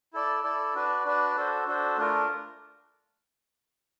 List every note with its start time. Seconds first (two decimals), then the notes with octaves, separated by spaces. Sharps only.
0.13 E4 A4 D5
0.44 E4 A4 D5
0.75 D4 F#4 B4 D5
1.05 D4 F#4 B4 D5
1.36 D4 F#4 A4 C5
1.67 D4 F#4 A4 C5
1.98 A3 D4 F4 A#4